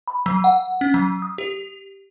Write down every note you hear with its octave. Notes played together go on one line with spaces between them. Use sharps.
B5
F#3
F#5
C#4
F#3
D#6
G4